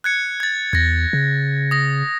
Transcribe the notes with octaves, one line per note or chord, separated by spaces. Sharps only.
F#6 G#6 C#7
G#6 A6
E2 G#6 A#6
C#3
D#6 A#6